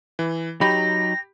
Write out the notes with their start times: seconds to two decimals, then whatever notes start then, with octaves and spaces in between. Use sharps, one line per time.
0.19 E3
0.61 F#3 D#4 G4 B5 A#6